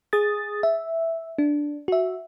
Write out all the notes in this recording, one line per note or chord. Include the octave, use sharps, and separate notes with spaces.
G#4 D#6 A6
E5
D4
F#4 E5